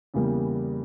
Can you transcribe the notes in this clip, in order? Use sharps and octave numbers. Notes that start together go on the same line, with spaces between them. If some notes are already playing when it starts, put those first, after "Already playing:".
E2 C#3 E3 G3 A#3